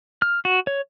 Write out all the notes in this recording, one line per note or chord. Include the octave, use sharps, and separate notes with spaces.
F6
F#4
C#5